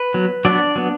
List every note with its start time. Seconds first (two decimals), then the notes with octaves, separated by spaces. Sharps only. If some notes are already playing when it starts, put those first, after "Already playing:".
Already playing: B4
0.14 F#3 B3
0.45 F#3 B3 D4 D5
0.76 F#3 B3